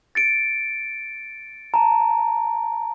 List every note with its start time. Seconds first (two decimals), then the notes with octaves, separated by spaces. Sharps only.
0.15 A6 C#7 D7
1.74 A5 A#5